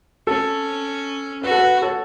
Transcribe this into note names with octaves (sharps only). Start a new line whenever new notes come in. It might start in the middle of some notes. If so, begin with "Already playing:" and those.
C#4 A4
F#4 B4
A4
B4
A4 C#5